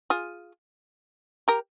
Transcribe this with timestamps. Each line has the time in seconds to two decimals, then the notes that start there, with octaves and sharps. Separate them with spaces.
0.10 F4 G#4
1.48 G4 A#4